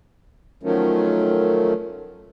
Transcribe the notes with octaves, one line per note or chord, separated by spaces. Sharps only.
D#3 F3 F#3 A3 C#4